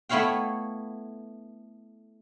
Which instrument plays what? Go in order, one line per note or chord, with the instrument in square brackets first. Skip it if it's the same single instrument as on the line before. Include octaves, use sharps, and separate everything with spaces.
[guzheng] A3 B3 E4 C#5 F5 G5